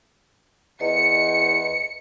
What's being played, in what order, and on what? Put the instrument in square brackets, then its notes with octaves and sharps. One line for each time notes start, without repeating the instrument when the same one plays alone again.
[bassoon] E2 [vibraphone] D#5 [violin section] C#7